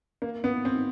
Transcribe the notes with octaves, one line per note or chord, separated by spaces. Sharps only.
A#3
B3
C4